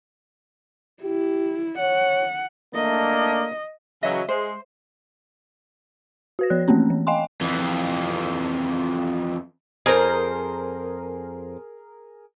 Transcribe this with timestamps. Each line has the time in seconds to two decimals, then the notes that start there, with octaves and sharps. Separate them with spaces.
1.03 E4 G4
1.79 C#5 F#5
2.75 A3 A#3 D4 D#5
4.03 C#3 E3 F#3 D#5 E5
4.29 G#3 C5
6.39 F#4 B4 A#6
6.50 F3 C#5 F#6
6.68 E3 A3 A#3 C4 C#4
6.90 E3
7.07 D#5 F5 G5 G#5 C6
7.41 F2 E3
9.86 F2 G#4 A#4 C5